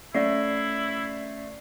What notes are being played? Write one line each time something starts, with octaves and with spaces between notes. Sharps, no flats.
A3 C#4 E4 D5 C7